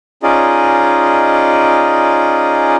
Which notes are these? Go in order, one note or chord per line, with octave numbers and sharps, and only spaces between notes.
C#4 D#4 F4 G#4 D5 D#5